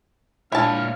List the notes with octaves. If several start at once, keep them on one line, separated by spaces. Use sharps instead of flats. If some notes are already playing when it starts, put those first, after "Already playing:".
A#2 D4 E4 C#5 F5 A5 F6